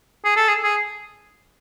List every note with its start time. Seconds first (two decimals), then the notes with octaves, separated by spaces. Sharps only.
0.25 G#4
0.36 A4
0.48 G#4
0.63 G#4